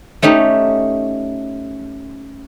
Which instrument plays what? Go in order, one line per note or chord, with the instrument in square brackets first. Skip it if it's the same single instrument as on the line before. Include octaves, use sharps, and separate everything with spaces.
[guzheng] A3 C#4 D#4 G4